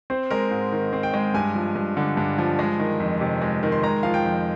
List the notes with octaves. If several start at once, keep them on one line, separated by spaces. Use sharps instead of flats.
C4 C5
G#3 A#4
G#2
D#3
C4
G5
G#3
G2 G#5
F3
G2
D3
G2
F3
G#3
D#3
F2
C3
G#3
D#3
C6
G#3 A#5
F3 F5
G5
F2